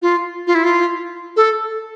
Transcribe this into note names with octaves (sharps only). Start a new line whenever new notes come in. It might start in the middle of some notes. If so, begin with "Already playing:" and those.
F4
F4
E4
F4
A4